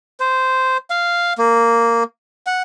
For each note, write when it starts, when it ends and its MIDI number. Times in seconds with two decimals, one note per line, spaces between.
0.20 0.77 72
0.90 1.33 77
1.38 2.03 58
2.47 2.62 78